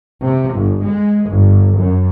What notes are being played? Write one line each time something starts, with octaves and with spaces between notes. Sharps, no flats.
C3
G1
G#3
G1
F#2